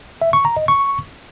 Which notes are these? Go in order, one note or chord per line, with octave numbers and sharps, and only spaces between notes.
E5
C#6
A#5
D#5
C#6